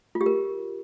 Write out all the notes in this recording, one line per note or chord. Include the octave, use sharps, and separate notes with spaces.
F4
G4
A#4